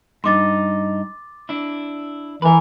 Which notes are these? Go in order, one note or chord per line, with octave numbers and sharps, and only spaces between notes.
G2 D#4 C6 D6 A6
D4 E4
E3 A#4 B4 E5 B5